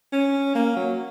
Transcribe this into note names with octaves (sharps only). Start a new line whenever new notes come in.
C#4
A#3
F#3